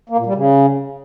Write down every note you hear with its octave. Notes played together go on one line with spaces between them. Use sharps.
A#3
A#2
G3
C#3